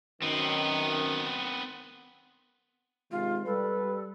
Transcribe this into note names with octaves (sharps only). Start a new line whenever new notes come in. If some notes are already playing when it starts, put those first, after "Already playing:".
F#2 D#3 B3 C4
C3 D#3 G#3 F4
G3 A4 B4